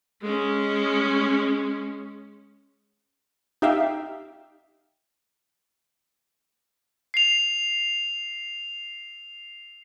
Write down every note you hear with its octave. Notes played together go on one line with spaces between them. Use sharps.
G#3 C#4
D#4 G4 E5 F5 G5
C7 F7